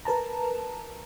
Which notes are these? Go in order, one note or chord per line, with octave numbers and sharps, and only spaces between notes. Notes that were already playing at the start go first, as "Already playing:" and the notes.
A#4 B4 A5 A#5